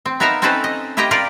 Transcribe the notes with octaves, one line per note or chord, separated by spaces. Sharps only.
C4
B3 D#4 A#4 E5 F5 A#5
C4 C#4 D#4 A4 B4 C5
D#5
E4 F4 G4 D#5 G5 A#5
F4 G4 A#4 D5 F5